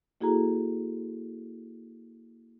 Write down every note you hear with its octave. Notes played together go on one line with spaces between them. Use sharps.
A#3 E4 F#4 G#4 A4 A#5